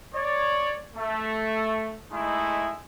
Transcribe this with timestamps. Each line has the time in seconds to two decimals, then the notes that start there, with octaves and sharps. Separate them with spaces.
0.15 C#5 D5
0.96 A3
2.12 G#3 A3 D#4 E4